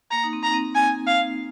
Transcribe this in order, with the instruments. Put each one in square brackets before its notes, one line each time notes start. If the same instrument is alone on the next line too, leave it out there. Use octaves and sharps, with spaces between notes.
[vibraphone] A#3 [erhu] A#5
[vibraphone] D#4
C4
[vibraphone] D#4 [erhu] A#5
[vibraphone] C4
[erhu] G#5
F5